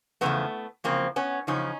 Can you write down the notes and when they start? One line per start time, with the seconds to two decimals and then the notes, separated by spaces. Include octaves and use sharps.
0.21 E2 C#3 F3 A3 B3
0.84 E2 C#3 F3 A#3 C4
1.16 B3 C#4
1.47 E2 C#3 F3 C#4 D#4